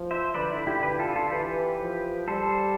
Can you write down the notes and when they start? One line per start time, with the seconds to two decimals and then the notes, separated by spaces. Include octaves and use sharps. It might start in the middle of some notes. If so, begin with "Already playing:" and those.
Already playing: F3
0.11 C5 E5
0.35 D3 B4 D5
0.52 E4
0.67 E4 G4
0.83 D3 G4 B4
0.99 F4 A4
1.16 F4 A4
1.31 E3 G4 B4
1.80 F3
2.28 G3 A4 C5